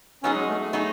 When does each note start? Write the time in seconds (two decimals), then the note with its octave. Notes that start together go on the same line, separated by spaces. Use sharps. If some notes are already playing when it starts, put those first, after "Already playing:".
0.23 F#3 B3 C#4 D#4 G#4
0.36 G#3
0.48 A3
0.61 A3
0.73 F#3 B3 D#4 G#4